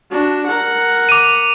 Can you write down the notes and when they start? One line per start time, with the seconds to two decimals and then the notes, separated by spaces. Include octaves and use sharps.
0.12 D4 F#4
0.47 A#4 F#5
1.09 D6 D#7